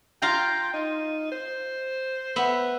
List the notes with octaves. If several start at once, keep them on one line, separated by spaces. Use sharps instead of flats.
F4 F5 G5 A#5
D#4
C5
B3 E5